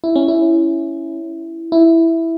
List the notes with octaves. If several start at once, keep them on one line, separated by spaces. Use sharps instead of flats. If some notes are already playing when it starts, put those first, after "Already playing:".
E4
C#4
E4
E4